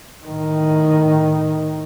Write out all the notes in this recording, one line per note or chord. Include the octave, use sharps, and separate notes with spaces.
A2 D#3